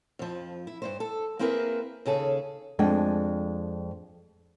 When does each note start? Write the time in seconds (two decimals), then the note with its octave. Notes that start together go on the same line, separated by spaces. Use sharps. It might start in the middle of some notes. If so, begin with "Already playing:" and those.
0.19 F2 F3
0.67 E4
0.82 G2 A#2 C5
1.00 A4
1.39 A#3 C4 E4 G#4 A#4 B4
2.06 D#2 C#3 G#4 A4
2.79 F2 G#3 D4 G5